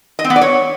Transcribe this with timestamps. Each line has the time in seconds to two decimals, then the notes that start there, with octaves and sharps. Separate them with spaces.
0.19 D#5
0.24 C4
0.30 B3
0.36 D5
0.41 C#5